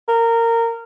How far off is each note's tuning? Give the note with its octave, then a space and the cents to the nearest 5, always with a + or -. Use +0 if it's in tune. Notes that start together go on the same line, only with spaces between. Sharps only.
A#4 -20